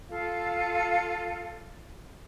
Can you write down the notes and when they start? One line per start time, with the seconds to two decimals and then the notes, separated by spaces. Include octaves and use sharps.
0.10 F4 A4 F5